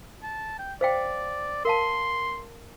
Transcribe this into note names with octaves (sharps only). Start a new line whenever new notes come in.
A5
G5
C5 D5 F5 G5
A#4 F5 A5 C6